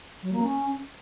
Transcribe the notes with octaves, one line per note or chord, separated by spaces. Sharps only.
F#3
A#3
C#4